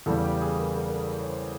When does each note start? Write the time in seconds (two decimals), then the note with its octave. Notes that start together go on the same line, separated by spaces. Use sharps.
0.06 E2 C#3 E3 G3 A4
0.24 G4
0.41 G#4
0.59 A#4
0.77 A#4
0.89 A#4
0.95 A4
1.21 C#5
1.30 C5